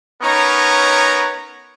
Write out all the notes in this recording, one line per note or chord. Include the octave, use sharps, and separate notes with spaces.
B3 C#4 D#4 A#4 C#5 A#5